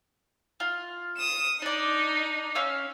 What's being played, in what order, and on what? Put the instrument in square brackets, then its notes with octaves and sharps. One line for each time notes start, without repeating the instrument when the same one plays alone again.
[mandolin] F4
[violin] D#6 E7
[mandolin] D4 D5 [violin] D#4
[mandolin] C#4 F5 E6